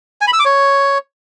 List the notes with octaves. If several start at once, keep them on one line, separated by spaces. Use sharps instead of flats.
G#5
B5
E6
D6
C#5